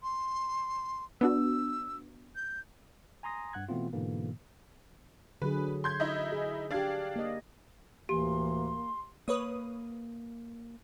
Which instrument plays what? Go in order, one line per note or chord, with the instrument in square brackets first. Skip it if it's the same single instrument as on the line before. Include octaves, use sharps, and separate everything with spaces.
[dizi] C6
[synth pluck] B3 D4 F#4 [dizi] E6
[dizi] G6
[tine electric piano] G#5 A#5 C6 D#6 A#6
G2 F#5 F#6 G#6
B2 E3 A3 B3 C4 F4
G#2 B2 D3 E3 A#3
[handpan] D3 F#3 G#4 [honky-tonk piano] B4
[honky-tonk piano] C6 G6 G#6
D#4 E4 D#5
[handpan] G#4
[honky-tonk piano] D4 F5 G#6 [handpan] G4 D5
[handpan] A#3 D#5
[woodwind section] D2 A2 E3 [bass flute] A#3 [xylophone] G4 [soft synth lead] C6
[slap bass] A#3 [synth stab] B4 C#5 D#6